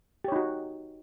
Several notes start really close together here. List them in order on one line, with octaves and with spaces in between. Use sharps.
G4 C#5 D#4 F#4